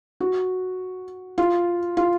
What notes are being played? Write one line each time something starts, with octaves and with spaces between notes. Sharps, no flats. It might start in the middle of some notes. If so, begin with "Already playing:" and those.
F#4
F4
F4